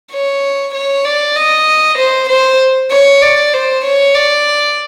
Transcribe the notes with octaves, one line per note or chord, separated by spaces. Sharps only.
C#5
C#5
D5
D#5
C5
C5
C#5
D5
C5
C#5
D5